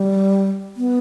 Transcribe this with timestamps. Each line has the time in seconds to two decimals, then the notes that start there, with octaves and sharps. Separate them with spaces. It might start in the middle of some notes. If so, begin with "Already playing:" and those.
Already playing: G3
0.77 B3